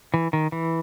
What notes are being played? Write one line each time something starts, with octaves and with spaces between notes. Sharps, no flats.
E3
D#3
E3